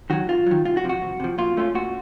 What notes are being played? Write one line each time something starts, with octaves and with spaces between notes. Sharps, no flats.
D#3 F#3 F#4
F#2 F4
D#3 F#3
C2 F4
F#4
C3 F3
F#4
C2
C3 F3
A#2 F4
A3 C#4 F4
A#2 F#4